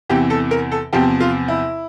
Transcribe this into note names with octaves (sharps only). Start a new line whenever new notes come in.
E2 C3 E3 G4
A4
A#4
A4
E2 C3 F3 G4
F4
E4